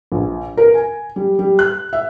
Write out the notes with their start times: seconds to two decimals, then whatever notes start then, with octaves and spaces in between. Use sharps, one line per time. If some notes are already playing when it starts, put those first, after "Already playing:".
0.12 A#1
0.57 A#4
0.74 G#5
1.16 G3
1.39 G3
1.59 F#6
1.93 E5